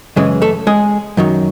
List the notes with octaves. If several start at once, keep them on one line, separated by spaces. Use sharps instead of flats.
F#2 C#3 E3 G#3
A3 A4
G#3 G#4
F#2 D#3 F#3